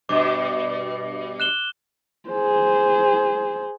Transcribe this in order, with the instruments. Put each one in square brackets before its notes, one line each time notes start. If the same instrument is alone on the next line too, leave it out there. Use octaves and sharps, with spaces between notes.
[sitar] G2 B2 [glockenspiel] D6
[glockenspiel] F#6 E7 G7
[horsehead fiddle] G#4 C5